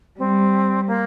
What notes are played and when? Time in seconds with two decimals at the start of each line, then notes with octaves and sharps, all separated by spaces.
0.19 G3 C4
0.87 A#3